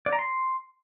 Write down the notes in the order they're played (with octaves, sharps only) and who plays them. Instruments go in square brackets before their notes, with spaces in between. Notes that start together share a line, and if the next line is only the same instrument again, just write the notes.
[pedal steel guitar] D5
A#5
C6